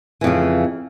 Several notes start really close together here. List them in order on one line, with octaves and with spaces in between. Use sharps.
E3 F2 C#3